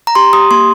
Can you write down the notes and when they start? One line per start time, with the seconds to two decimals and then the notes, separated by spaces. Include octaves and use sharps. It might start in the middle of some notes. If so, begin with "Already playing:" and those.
0.07 A#5
0.15 G4 C6
0.33 G4 D#6
0.51 A#3 C6